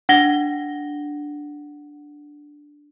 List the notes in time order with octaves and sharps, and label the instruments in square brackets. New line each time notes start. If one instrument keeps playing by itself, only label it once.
[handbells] D4 [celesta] F#5 A#6 G7